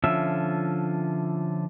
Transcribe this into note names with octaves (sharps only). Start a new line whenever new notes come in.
D3 F3 C#4 F4 E5